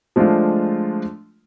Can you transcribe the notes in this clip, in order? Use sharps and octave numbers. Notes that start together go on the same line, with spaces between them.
F3 G#3 A3 D4 F4